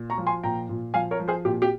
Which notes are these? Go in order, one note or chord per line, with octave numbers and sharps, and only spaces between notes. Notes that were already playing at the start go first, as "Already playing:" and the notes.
Already playing: A#2
A#5 C#6
F3
G#5 C6
A#2 G5 A#5
A#2
F3 F5 G#5
A#4 C#5
F3
G#4 C5
A#2 G4
G4